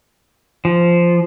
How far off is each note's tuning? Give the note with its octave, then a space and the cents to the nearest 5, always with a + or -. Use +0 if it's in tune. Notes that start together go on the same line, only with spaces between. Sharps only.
F3 -10